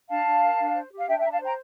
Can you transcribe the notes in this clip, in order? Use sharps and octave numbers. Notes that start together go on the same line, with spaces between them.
D4 F5 A5
D4
A#4
D4
C5
G4
F5
D4 E5 G5
E5 G5
D4 A#5
F5 A5
C5 G5 A#5